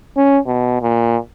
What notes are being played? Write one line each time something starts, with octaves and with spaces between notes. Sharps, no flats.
C#4
B2
A#2